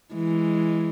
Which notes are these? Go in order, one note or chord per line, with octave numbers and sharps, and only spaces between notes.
E3 G#3